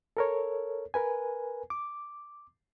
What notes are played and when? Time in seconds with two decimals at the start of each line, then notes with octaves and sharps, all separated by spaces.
0.17 A4 A#4 C#5
0.94 A#4 B4 G#5
1.70 D6